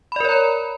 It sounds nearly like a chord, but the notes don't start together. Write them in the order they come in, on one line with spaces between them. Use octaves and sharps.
B5 D5 A#4 C#5 A#5